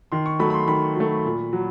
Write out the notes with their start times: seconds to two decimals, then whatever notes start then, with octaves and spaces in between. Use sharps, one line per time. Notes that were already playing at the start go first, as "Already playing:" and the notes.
0.12 D#3 C6
0.26 C#6
0.39 F#3 A3 B5
0.50 B5
0.54 C6
0.68 D#3 B5
0.96 F#3 A3
1.25 A#2
1.53 F#3